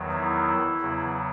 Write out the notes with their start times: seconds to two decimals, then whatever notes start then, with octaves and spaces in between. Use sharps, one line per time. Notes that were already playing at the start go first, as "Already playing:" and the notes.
Already playing: E2 D#3 F#3
0.11 E3 E4
0.80 E2 C#3 F#3